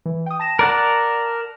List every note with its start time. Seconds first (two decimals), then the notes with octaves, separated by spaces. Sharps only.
0.06 E3
0.26 G5 D#6
0.40 A5 A#6 E7
0.59 A#4 D5 F#5